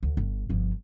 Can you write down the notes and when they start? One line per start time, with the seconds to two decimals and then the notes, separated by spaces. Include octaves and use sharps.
0.03 D2
0.17 G1
0.49 G1 F3